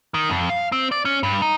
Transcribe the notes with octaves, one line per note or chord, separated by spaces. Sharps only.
D#3
F2
F5
C4
D5
C#4
G2
D#4